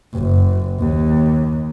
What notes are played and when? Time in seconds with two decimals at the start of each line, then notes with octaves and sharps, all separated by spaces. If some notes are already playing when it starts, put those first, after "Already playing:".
0.14 F#1
0.79 D#2